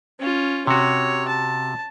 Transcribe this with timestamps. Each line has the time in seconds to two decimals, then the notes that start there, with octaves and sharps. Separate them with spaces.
0.19 C#4 F4
0.67 C3 F#4 C#5
1.28 A5